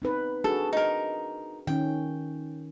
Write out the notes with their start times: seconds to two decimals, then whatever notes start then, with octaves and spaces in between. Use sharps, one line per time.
0.02 C4 D#4 B4
0.44 D4 F#4 G#4 A4
0.73 D#4 A#4
1.67 D#3 C#4 G5